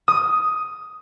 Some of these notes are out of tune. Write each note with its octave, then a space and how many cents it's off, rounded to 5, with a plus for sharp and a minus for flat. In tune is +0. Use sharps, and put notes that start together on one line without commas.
D#6 +10